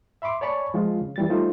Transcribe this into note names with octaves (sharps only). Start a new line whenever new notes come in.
E5 B5 C6 D6
C#5 D5 G#5 A5 B5 C#6
F3 G#3 F4
C#3
E3 G3 A6
G3 A3 D#4 F4 A4 C5